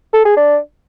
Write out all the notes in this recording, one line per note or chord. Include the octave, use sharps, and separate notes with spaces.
A4
G#4
D4